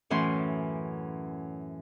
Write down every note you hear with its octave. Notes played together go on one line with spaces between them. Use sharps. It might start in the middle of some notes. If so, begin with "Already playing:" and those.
F#2 A2 E3 C#4 C6